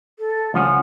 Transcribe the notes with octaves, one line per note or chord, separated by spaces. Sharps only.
A4
C#2 F3 C#4 F#5